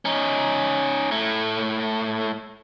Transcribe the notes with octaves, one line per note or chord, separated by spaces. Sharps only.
C#4 D#4
A2 A3